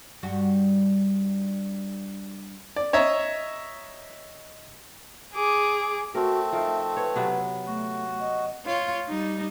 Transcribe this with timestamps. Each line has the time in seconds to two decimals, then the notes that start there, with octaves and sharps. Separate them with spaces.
0.23 G2 G3 F#4
2.76 D5
2.93 C#5 D#5 E5 A#5
5.34 G#4 D6
6.15 A3 C4 F#4 A#4
6.52 F3 D#4 A#4 E5
6.97 B4 C#5
7.16 C3 F#3 B3
7.67 A3 F#4
8.21 D#5
8.65 F4 C#5
9.09 G3 D#4